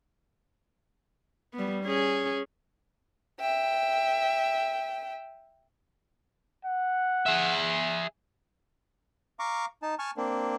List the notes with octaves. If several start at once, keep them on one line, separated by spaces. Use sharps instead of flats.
G3 B3
C#4 G#4
E5 G5
F#5
G#4 E5
F5 A#5 C#6 D6
D#4 A5
G#5 A5 C#6 F6
A#3 C4 D4